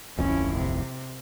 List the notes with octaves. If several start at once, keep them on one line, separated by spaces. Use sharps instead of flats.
D1 A1 F2 C#4 E4
C3